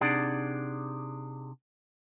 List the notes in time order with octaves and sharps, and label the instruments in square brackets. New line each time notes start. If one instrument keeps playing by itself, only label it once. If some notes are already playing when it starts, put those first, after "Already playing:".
[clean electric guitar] C3 D4 D#4 G#4 D5 F#5